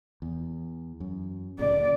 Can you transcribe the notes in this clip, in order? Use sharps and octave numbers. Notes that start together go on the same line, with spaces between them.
E2
F#2
D2 A#2 C#3 D5